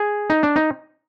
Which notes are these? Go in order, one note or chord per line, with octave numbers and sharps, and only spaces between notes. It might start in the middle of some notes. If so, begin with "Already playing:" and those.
Already playing: G#4
D#4
D4
D#4